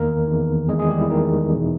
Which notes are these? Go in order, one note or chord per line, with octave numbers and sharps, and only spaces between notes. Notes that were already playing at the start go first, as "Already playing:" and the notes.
Already playing: E2 D#3 A#3 A#4
E2 D#3
E2 D#3 G#3 G#4
G#3 G#4
G3 G4
E4
E2 D#3 D#4
E2 B2